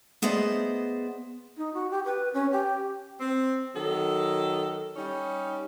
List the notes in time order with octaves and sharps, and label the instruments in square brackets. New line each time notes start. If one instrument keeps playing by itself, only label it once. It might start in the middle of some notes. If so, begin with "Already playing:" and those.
[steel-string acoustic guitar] A3 B3 G#4 C5 D5 D#5
[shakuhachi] D#4
F#4
G4
B4
C#4
G4
[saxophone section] C4
D#3 F#3 A4
G3 C#4 D#4